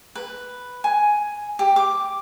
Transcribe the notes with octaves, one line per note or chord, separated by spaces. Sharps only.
B4
G#5
G4
D6